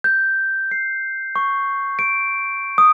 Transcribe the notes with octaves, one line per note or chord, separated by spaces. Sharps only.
G6
C7
C#6
D7
D#6